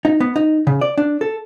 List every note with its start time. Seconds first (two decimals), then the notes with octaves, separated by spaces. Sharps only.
0.05 D#4
0.20 B3
0.36 D#4
0.67 C#3
0.81 D5
0.98 D4
1.21 A4